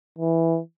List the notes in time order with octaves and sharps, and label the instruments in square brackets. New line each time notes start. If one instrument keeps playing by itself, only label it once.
[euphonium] E3